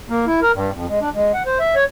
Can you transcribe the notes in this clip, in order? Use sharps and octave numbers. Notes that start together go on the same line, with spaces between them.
A#3
E4
A#4
G2
F2
G#3
D4
G#3
F#5
C5
E5
C#5